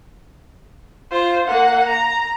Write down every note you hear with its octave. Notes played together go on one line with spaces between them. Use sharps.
F4 C5
A#3 F#5
A#5